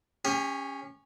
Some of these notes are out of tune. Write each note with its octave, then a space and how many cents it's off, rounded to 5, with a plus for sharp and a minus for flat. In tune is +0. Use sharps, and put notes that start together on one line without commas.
C#4 +0 G4 +40